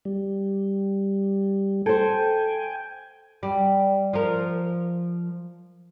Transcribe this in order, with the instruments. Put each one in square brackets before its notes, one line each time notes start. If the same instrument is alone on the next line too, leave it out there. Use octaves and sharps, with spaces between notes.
[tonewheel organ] G3
[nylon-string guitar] A4 C5 [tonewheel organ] G5 G#5
[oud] G3
F3 A#4